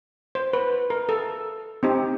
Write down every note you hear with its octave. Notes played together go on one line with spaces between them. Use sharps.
C5
B4
A#4
A4
C4 D#4 G4